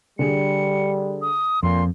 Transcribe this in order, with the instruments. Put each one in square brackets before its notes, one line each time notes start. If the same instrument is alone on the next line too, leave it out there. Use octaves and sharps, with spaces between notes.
[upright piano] D3 G#4 [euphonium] G3 [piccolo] C#7
[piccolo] D#6
[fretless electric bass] F2 [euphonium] A#2 [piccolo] C6